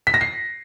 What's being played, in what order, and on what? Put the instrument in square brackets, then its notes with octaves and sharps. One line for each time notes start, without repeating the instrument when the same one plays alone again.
[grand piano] B6
A#6
C7